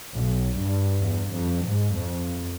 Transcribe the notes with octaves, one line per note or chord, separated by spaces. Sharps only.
B1
G2
E2
F2
G#2
F2